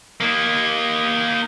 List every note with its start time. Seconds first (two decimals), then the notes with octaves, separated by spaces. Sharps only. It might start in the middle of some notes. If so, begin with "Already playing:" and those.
0.20 A#3 D#4